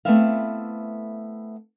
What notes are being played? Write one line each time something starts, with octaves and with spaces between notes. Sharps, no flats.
A3 B3 C4 E4 E5 F5